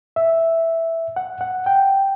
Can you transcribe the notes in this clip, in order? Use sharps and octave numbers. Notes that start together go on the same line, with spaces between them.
E5
F#5
F#5
G5